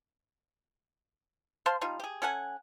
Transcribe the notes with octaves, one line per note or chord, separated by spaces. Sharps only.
C5 F5 A5 C6
G3 D#4 F4
G4 G#4
C#4 A4 F#5 G#5